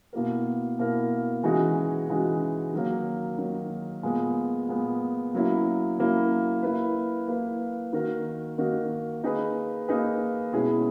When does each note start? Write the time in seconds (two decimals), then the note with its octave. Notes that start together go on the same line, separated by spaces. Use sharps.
0.13 B2 A#3 E4 A#4
0.78 B2 A#3 E4 A#4
1.43 C#3 E3 G#3 D#4 F#4
2.08 C#3 E3 G#3 D#4 F#4
2.73 D#3 F#3 A#3
3.38 D#3 F#3 A#3
4.03 A#2 G#3 B3
4.68 A#2 G#3 B3
5.33 C#3 F#3 A#3 E4
5.97 C#3 F#3 A#3 E4
6.62 A#3 E4 B4
7.28 A#3 E4 B4
7.93 D#3 A#3 D#4 F#4 A#4
8.58 D#3 A#3 D#4 F#4 A#4
9.23 A#3 D#4 G#4 B4
9.88 A#3 D#4 G#4 B4
10.53 B2 G#3 C#4 E4 G#4